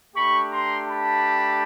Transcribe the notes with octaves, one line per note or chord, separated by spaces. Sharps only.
A3 D4 G4 B5 C#6
A#5 C6
A5 B5